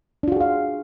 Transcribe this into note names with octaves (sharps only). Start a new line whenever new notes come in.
D4 F4 F#4 G#4 F5